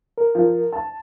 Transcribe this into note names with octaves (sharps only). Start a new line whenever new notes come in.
A#4
F3
A5